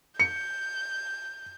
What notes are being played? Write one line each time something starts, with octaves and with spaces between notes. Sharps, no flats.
G6 C#7